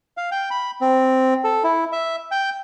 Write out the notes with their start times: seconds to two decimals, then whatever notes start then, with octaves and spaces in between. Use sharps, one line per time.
0.17 F5
0.32 G5
0.51 B5
0.81 C4
1.44 A4
1.64 E4
1.92 E5
2.31 G5